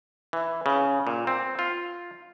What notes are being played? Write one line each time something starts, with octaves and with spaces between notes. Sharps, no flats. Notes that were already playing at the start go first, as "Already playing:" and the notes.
E3
C#3
A#2
C4
F4